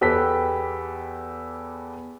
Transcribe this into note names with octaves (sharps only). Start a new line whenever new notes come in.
E2 G4 A4 B4 G5 B6